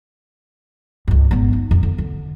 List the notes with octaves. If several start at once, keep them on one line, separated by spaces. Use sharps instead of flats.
C#2 G2
G#1 B3
D#4
F2
D3
D3